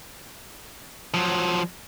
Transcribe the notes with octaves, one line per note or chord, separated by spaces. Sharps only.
F3 F#3